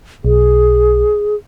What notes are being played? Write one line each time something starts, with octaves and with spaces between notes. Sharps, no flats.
B1 G#4